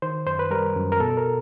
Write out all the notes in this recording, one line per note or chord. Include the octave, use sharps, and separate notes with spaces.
D#3 C5
F#2 C5
B4
G3 A#4
F#2
A#4
B2 A4
A#4